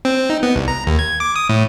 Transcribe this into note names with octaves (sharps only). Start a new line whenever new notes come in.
C4
D#4
B3
C2
A#5
D#2
G#6
D6
D#6
A2